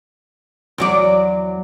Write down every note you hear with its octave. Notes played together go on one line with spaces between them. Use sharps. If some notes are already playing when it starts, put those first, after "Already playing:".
E2 F#3 D5